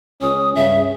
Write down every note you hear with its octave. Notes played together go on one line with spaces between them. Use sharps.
C#2 C#4 D#6
G2 C#3 E5